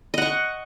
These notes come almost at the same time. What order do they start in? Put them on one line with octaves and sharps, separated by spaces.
D#5 F#5 C#6